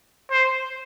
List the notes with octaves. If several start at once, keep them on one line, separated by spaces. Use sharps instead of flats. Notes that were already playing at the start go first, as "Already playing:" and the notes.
C5